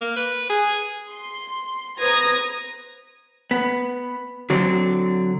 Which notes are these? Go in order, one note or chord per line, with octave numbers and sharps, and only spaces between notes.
A#3
B4
G#4
C6
B4 C5 A#5 D#6 G#6 A#6
B3
D3 F#3 C4 D4